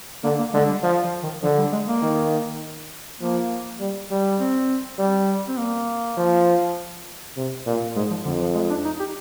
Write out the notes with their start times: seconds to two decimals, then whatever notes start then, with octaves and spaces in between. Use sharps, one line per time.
0.24 D3 A#3
0.39 A#3
0.54 D3 G#3
0.68 G3
0.83 F3
1.04 F3
1.23 D#3
1.43 D3 F3
1.58 G3
1.72 G#3
1.87 A#3
2.02 D#3
3.21 F3 A#3
3.80 G3
4.10 G3
4.40 C4
4.99 G3
5.48 C4
5.59 A#3
6.17 F3
7.37 C3
7.66 A#2
7.95 G#2 G#3
8.11 F3
8.25 F2 D3
8.41 F3
8.55 G#3
8.70 D4
8.85 D#4
8.99 G4